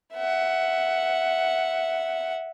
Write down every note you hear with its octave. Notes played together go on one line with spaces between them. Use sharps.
E5 F#5